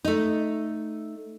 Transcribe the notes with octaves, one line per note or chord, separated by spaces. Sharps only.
A3 D#4